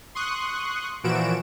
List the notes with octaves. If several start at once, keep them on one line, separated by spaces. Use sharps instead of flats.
C6 C#6 D#6 F#6
A#2 E3 F3 F#4 D7 E7